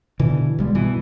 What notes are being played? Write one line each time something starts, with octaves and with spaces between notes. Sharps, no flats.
B2 D3 E3
B1 G3 G#3
G2 B2 E3